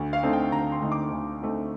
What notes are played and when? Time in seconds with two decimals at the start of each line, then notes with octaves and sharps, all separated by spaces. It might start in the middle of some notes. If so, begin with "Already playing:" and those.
Already playing: D2
0.13 F5
0.23 D3 A3 C4 D#4
0.33 G5
0.52 D2 A#5
0.72 C6
0.82 D3 A3 C4 D#4
0.92 D6
1.12 D2
1.41 D3 A3 C4 D#4